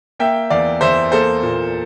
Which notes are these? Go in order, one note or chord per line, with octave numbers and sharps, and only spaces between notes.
A#3 E5 G5
E2 D5 F5
E2 C5 E5
A#3 A4 C5
A#2